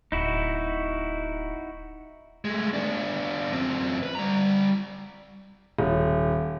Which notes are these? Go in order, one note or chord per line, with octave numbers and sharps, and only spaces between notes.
D1 D#4 E4 F#4
G#3 A3
B3 D4
F#2 C4
B4
G3 A#5
D#1